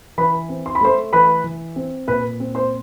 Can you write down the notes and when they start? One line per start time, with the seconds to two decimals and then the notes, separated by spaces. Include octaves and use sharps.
0.18 E3 B4 B5
0.49 C4
0.66 C6
0.75 B5
0.81 A3 C5 C6
1.13 E3 B4 B5
1.44 E3
1.76 C4
2.08 A#2 B4 B5
2.40 C4
2.55 C5 C6